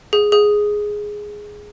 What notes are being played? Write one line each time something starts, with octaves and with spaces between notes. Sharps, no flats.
G#4
G#4